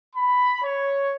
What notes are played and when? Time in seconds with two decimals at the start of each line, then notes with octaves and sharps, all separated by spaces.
0.14 B5
0.62 C#5